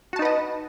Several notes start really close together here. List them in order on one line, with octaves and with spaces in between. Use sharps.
F#4 A5 D#4 B4 D#5